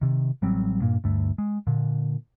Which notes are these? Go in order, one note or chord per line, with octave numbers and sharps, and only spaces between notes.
C3 D#3
A1 F#3 G3 C4
G2 A#2 A#3
D2 G2 A3
G#3
A#2 D3